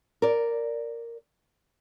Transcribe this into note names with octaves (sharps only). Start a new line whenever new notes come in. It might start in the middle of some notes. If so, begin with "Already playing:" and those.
A#4 D5